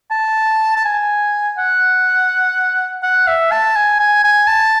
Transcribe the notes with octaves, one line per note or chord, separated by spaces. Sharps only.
A5
A5
G#5
F#5
F#5
E5
A5
G#5
G#5
G#5
A5